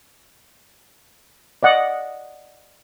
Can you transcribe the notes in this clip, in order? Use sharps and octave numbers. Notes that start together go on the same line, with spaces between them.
D5 D#5 F#5